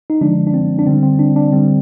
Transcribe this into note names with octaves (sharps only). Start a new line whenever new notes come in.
D#4
D3 F3 G#3 D4
D4
C4
D4
D3 G3 C4
C4
D4
D4
D3 G3 C4